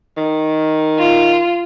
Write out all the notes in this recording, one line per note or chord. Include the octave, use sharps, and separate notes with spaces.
D#3
F4